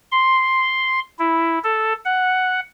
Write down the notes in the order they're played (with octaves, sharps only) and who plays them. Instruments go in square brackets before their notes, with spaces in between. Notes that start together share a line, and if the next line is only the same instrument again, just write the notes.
[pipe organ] C6
E4
A4
F#5